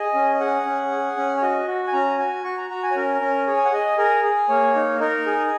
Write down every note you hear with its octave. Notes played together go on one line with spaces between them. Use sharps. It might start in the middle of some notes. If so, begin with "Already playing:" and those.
Already playing: G#4 D#5
C#4
D#5
G#4 F#5
C#4
G#4
C#4
C#5
F#4 D#5
F#4
G#5
C#4 A#5
F#4 G#5
F#4 C#6
A#5
F#4 A#5
G#5
C#5
C#4 A#4
C#4
G#4 C#5
G#5
F#5
G#4 D#5
G#4 A#4
G#4
A#3 C#5
D#4
D#4 A#4
G#4